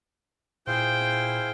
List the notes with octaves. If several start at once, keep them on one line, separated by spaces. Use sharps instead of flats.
A#2 E4 G#4 C5 F5 G5